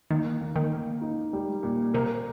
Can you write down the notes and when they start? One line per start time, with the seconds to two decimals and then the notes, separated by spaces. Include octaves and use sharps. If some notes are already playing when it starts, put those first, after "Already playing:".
0.11 D#3 A#3
0.41 A#3
0.56 D#3
0.72 A#3
1.02 D#4
1.33 G3
1.63 A#2
1.94 C3 A#4